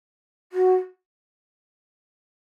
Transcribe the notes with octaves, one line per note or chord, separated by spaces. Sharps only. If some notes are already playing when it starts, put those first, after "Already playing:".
F#4